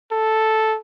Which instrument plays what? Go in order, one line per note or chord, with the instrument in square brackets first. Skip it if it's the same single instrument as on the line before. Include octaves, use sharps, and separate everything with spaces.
[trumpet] A4